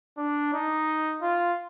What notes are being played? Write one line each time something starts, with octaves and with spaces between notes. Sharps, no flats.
D4
D#4
F4